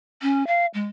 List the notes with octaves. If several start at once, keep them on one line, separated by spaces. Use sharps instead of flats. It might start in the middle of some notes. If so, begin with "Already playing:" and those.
C#4
F5
G#3